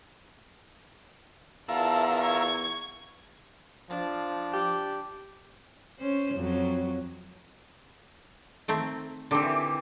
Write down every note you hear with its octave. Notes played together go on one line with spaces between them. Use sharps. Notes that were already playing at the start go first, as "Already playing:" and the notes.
E2 F4 A#4 E5 F#5 A5
C#6 G#6
F3 D4
G4
C#4 C5
F2 F#3
D#3 A3 C4
D3 D#3 C4 G4 D6
E3